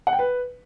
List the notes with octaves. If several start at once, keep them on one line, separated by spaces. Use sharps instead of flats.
F#5
G5
B4